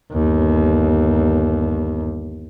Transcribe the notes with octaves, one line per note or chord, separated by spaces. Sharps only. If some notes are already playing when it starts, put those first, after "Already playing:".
G1 D#2